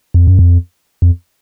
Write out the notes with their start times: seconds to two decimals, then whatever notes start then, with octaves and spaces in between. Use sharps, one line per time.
0.14 F2
0.27 F#2
0.39 F2
1.02 F2